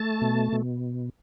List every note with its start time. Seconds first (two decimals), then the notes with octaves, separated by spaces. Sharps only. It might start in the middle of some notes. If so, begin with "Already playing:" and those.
Already playing: A3 A5
0.21 B2
0.52 B2